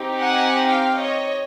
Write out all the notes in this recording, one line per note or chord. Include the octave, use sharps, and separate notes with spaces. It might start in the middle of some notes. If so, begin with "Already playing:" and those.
Already playing: C4 D#4 G4
F#5 G#5
F5 G5
C#5 D#5